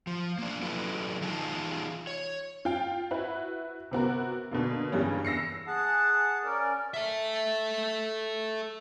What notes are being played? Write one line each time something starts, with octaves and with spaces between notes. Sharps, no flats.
F3
A#3 D4
F#3 E4 A4 B4 D5
E3 D#4 F4 G#4 A5
C#5
F4 G5
E4 F#4 B4
C3 B3 F#4 A#4
B2 D3 A#3
G2 C#3 E3 G3 A#3 C#4
E6 A#6 C7 C#7
G#4 F#5 A5
C#4 A#4 D5
A4 E5